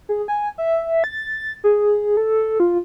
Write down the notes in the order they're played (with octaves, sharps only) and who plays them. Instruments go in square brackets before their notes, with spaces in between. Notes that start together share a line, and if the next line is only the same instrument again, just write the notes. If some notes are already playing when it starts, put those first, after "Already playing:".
[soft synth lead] G#4
G#5
E5
A6
G#4
A4
F4